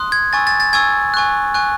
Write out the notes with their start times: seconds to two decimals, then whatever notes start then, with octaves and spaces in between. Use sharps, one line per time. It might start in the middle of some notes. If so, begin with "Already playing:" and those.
Already playing: C6 D#6 F#6
0.12 G#6
0.33 G#5 C#6 E6 A6
0.47 A6
0.60 A6
0.73 G#5 C#6 E6 G#6
1.14 G#5 C#6 F#6
1.54 G#5 C#6 F#6